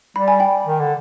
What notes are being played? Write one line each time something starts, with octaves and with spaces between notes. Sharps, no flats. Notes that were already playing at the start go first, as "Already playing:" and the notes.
G3 B5
G#5
G5 B5
D#3
D3